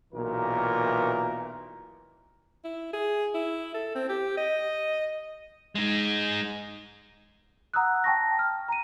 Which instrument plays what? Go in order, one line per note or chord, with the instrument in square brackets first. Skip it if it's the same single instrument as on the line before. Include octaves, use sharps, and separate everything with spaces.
[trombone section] B1 A#2 E3 A#4
[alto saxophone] E4
G#4
E4
A4
C4
G4
D#5
[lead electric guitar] G#3 D#4
[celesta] F#5 A#5 D#6 E6 F#6
G5 A5 C#6 A#6
F6
A#5 D#7